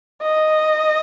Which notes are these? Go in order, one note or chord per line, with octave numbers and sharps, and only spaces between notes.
D#5